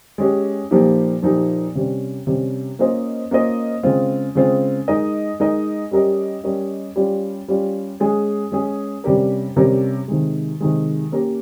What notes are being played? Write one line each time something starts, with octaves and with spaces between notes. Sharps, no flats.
G#3 C#4 G4
A#2 F3 A#3 D#4 G4
A#2 F3 A#3 D#4 G4
C3 G3 C#4
C3 G3 C#4
A#3 C#4 F4 C5 D#5
A#3 C#4 F4 C5 D#5
C#3 G#3 C4 F4
C#3 G#3 C4 F4
G#3 D#4 A#4 D#5
G#3 D#4 A#4 D#5
G3 C#4 G4 A#4 D#5
G3 C#4 G4 A#4 D#5
G3 C#4 F4
G3 C#4 F4
G#3 C#4 G#4
G#3 C#4 G#4
C3 G3 C#4 G4 A#4
C3 G3 C#4 G4 A#4
C3 D#3 G#3
C3 D#3 G#3
A#3 C#4 G4 A#4 C#5